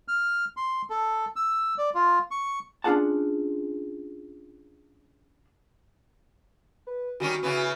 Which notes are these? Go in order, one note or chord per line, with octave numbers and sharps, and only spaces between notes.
F6
C6
A4
E6
D5
F4
C#6
C#4 D4 F4 G#4 F#5 A5
B4
D#3 G3 C#4 F#4
C#3 E3 B3